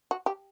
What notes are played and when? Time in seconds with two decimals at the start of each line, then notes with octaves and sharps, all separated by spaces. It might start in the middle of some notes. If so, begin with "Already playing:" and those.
0.11 F#4
0.26 G4